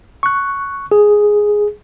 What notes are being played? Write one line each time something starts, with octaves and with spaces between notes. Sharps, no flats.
C#6 F#6
G#4